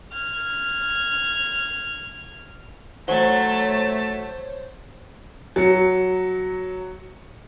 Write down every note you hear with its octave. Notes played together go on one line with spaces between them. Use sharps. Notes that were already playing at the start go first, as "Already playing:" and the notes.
F6 G#6
F#3 A3 F#4 C5 C#5 A5
F#3 C#7